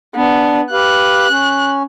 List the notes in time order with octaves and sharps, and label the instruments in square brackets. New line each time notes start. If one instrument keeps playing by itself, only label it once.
[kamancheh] B3 [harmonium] D4
[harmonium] G4 B4 F5 [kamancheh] F#6
[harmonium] C#4